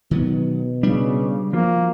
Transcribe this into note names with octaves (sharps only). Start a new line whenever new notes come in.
B2 D#3 F#3 B3
C#3 G3 D4
F3 A#3 F4 F#4